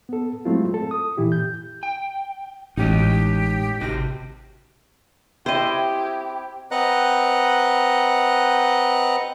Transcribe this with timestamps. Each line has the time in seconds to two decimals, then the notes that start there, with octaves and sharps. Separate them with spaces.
0.09 B3 A4
0.45 F#3 G#3 A3 C4 E4 F4
0.74 A4
0.91 D#6
1.17 A#2 E3 E4 G4
1.32 G6
1.83 G5
2.77 A1 A2 G#3 D#4 G4 C#5 D#5
3.81 G#1 C3 F#4 G4 A#6
5.46 C4 E4 G4 C5 D#5
6.71 C4 B4 D#5 F#5 A#5 F#6